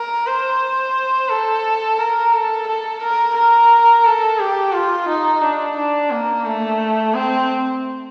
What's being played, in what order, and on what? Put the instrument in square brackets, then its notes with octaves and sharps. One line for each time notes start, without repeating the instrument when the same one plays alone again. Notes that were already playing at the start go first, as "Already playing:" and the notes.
Already playing: [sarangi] A#4
C5
A4
A#4
A4
A4
A#4
A#4
A4
G4
F4
D#4
D4
D4
A#3
A3
C4